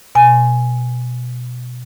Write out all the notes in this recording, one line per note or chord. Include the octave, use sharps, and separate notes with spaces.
B2 G#5